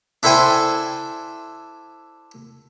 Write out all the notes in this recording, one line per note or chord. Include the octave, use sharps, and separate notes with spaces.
D4 E4 A4 C5 G5 G#5